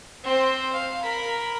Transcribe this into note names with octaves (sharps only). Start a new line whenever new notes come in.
C4 C5
F5
A#4 B5